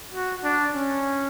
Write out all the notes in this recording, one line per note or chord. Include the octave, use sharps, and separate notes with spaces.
F#4
D4
C#4